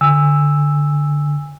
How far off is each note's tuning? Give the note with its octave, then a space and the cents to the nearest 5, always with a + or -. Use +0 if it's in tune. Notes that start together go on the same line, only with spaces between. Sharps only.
D3 +0 G#5 -20 E6 +0